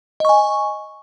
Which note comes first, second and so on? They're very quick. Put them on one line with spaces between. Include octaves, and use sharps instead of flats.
D#5 C#6 G#5